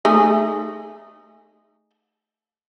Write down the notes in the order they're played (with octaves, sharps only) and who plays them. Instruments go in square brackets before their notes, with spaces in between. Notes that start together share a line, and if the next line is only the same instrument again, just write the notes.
[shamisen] A3 D#4 G#4